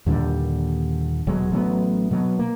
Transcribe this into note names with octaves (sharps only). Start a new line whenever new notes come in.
D#2 A#2 D3 G3
D#1 B2 F#3 G#3
A1 F#3 A#3 B3
B2 F#3 G3 B3
A#3